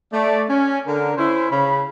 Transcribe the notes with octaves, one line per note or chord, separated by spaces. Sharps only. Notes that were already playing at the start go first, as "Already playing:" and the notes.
A3 D5
C#4
D3 A#4
C#4 E4 C5
C#3 B5